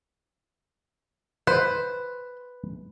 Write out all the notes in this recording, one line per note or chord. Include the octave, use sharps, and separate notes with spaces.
B4 C5